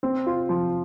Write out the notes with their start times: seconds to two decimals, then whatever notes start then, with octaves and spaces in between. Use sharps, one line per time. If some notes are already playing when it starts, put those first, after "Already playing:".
0.03 C4
0.26 F4
0.49 F3